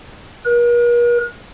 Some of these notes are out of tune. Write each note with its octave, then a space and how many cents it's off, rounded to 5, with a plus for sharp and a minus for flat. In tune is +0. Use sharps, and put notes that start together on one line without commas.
A#4 +45